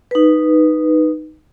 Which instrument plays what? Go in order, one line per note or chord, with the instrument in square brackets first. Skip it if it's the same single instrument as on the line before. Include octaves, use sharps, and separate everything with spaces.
[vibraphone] D#4 B4